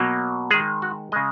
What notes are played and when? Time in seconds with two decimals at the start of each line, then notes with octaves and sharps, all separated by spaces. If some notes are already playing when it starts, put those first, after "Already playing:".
Already playing: B2 F#3 A#3
0.50 D#3 G#3 G#4
0.82 F#4
1.12 C#3 G#3 D#5